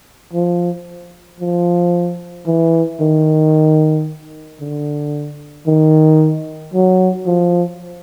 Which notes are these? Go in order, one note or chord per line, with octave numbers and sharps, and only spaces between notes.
F3
F3
E3
D#3
D3
D#3
F#3
F3